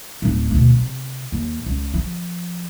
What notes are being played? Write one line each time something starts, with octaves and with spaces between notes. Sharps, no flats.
D1 D#4
D2 B2
C3
D#2
C#2
F3